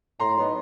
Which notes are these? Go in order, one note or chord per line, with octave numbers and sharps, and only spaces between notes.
A2 A#5 C6
F#3 B3 D#4